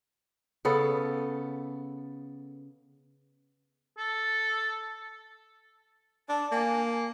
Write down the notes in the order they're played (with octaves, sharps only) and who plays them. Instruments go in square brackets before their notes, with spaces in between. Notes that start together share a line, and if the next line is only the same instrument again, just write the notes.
[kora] C#3 B3 A4
[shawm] A4
[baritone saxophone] D4 [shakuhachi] A5
[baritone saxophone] A#3 [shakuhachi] G#5